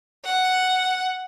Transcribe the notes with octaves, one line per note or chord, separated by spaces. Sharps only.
F#5